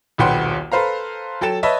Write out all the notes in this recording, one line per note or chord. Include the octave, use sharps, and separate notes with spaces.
D#1 B1 B4 F#5 G5 C6
A4 B4 C5 F5 A#5
F#3 A4 G5 A6 E7
B4 C#5 D#5 E5 A5